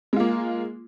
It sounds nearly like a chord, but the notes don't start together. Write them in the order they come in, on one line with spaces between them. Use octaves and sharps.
G#3 F4 A#3